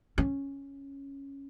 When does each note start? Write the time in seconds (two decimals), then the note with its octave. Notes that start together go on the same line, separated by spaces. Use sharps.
0.18 C#4